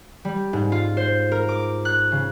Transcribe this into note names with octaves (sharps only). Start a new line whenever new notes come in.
G3
G#2
F4
C5
A#4
D6
F#6
C#3